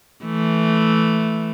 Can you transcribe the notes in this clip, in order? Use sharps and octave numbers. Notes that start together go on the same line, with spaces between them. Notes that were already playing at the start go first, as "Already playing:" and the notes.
E3 A3